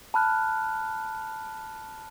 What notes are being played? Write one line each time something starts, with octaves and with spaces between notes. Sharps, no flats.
A5 B5 F6 F#6